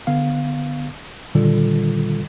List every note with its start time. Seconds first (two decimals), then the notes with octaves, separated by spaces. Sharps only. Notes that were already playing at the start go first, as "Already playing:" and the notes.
0.07 D3 B3 F5
1.35 A#2 D3 D#3 G3 F4 A4